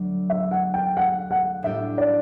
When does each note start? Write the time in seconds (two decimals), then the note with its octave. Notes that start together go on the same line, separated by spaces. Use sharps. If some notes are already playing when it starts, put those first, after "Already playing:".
Already playing: D2 D3 F#3
0.30 E5
0.51 F#5
0.74 G5
0.97 F#5
1.31 F#5
1.63 A2 G3 D4 G4 E5
1.98 D5